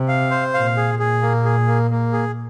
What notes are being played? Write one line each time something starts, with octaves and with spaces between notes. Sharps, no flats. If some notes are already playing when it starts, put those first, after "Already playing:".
Already playing: C3
F5
C5
A#2 F5
G#4
A#2 G#4
A#3
G#4
A#3
A#3
G#4